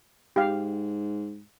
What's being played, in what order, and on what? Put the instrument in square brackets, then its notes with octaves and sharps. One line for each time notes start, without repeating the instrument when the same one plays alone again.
[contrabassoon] G#2 [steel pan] G4 F5